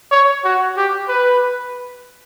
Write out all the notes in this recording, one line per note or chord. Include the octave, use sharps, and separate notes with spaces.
C#5
F#4
G4
B4